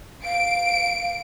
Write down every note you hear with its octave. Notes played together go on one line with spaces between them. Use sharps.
F5 D7